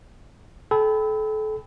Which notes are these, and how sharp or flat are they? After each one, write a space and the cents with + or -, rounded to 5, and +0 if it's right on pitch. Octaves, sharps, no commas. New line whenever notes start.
A4 -30 G5 +0 B5 +15